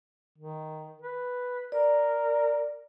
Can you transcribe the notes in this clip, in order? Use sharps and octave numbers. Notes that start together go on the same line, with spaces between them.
D#3
B4
A#4 D5